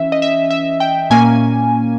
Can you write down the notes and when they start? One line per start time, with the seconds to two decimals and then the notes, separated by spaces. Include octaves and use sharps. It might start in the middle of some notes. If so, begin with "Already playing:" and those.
Already playing: E3 C#4 E5
0.12 D#5
0.22 E5
0.51 E5
0.80 G5
1.10 A#2 A#3 C#4 G#5